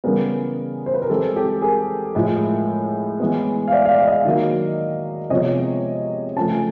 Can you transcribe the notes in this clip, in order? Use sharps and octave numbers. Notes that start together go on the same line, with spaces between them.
C#3 E3 G3 B3 G#4 A#4
C5
B4
A#4
E3 G#3 C4 G4 A4
G4 A4
G#4 A#4
A2 F3 G#3
E3 G#3 B3
F5
D5 E5
F5
D5 E5
E5
D#5 F5
D#3 F#3 A#3
C3 F3 G#3 B3 C#5 D#5
C#3 F3 A3 A5
G#5